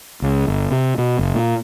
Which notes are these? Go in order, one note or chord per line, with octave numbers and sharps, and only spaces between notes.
C#2
G1
C3
B2
F#1
A#2